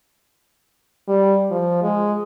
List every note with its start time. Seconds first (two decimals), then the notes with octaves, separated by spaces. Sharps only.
1.08 G3
1.51 F3
1.82 G#3